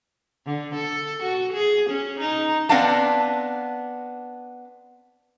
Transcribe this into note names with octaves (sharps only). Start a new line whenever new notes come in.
D3
A4
F#4
G#4
C#4
D#4
B3 C4 D4 F5 F#5 A5